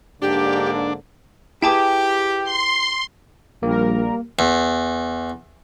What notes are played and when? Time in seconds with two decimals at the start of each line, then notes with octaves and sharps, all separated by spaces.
0.22 G#2 D3 A#3 D4 G4
1.62 E4 G4 G#4 B4 G5 A5 D6
2.44 C6
3.63 A#1 G3 A#3 A#4
4.39 E2